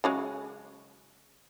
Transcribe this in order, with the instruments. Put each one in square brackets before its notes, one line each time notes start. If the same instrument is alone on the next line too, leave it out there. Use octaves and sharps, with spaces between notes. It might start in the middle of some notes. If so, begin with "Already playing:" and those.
[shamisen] C#3 F#3 G#3